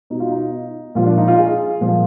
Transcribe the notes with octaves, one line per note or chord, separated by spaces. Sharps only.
B2 D#4
F4
D#4
A#2 F3 F4
D4
D#4
F4
G#4
A#2 F3